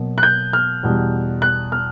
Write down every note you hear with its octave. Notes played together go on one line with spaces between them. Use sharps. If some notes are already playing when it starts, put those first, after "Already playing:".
Already playing: B2 F#3 A#3
F#6
G6
F6
E2 B2 G3
F#6
F6